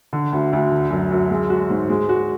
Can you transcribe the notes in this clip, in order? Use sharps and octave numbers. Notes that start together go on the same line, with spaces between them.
D3
D2
D2
D3
F#2
F#2
G#3
F#4
G#2
G#3
F#4